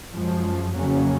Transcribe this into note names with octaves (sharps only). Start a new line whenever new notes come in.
F#2 F3 G#3
F2 C#3 F#3 A#3 C#4